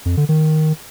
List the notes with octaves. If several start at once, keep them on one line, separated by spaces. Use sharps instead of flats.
F2
D3
D#3